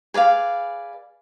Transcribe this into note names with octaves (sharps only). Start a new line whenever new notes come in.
G#4 B4 D5 F5